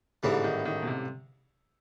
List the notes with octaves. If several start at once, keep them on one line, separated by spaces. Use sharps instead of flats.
A1 G#2 D3 E3 G3 A#3
D#3
D#3
B2
C3